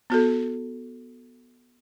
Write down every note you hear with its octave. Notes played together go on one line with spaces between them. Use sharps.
B3 F#4 A4